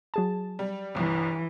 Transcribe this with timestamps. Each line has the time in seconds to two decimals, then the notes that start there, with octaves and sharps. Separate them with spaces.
0.14 F#3 G#4 A5
0.59 G3
0.95 G1 C2 E3